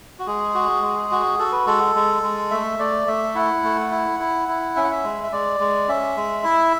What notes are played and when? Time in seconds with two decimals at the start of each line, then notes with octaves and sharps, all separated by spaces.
0.19 F#4
0.27 G#3 G#4
0.55 F#4
0.82 G#3
1.11 F#4
1.39 F#4 A4
1.52 B4
1.66 G#3 A4
1.96 G#3
2.23 G#3
2.51 A3 E5
2.79 A3 D5
3.07 A3 E5
3.35 E4 F#5
3.64 A3
3.91 E4
4.20 E4
4.49 E4
4.76 C#4 E5
4.84 F#5
4.91 E5
5.04 G#3
5.23 E5
5.32 G#3 D5
5.60 G#3
5.88 C#4 E5
6.17 G#3
6.44 E4